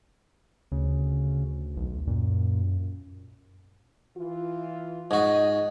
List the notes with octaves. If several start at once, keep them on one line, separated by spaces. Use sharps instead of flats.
D2 C#3
B1
F#2 A#2
E3 F4
G#2 F#4 D#5